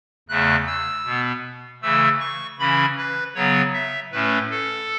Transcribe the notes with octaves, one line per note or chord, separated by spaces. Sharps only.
E2 C#3 A3 F#6
E6
B2 B3
C#3 E3 A3 E6
C#6
C#3 E3 C#4 B5
B4
C#3 F#3 B3 C#5
E5
A2 A3 C#4 B4
A4